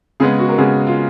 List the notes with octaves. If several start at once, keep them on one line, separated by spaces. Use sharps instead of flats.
C#3 G#3 B3 G#4
F#4
A#4
C#3 G#3 B3 G#4
F4